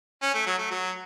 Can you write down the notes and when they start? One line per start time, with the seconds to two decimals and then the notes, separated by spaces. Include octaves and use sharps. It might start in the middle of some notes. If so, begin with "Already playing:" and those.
0.22 C#4
0.34 A3
0.46 F#3
0.58 A3
0.70 F#3